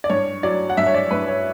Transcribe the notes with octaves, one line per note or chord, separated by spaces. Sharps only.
D5
G2 C#5
F#3 D5
F#5
G2 E5
C#5
D5
G2 B4
C#5